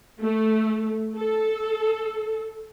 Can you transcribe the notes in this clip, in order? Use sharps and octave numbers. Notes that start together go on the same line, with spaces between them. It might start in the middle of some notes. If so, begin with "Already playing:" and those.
A3
A4